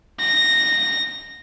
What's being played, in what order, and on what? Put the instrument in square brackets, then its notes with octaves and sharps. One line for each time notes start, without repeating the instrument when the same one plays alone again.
[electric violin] A#6